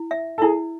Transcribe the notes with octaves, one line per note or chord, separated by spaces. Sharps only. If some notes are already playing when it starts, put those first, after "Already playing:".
Already playing: E4
E5
A4
E4 G#4